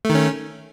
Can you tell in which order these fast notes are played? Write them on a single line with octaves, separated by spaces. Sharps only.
A3 D#3 C#4